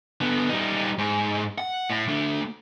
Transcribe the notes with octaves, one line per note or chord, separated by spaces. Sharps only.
D3 B3
G3 D#4
G#2
F#5
A2
A3 D4